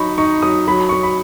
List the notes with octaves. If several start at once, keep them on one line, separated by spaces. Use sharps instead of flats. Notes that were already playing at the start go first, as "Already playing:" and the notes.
Already playing: F#3 D#4 B5 C#6
D#4 C#6
F#3 D#6
F#3 B5
F#3 C#6
B5